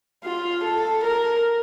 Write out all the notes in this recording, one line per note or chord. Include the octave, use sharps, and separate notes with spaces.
F4
A4
A#4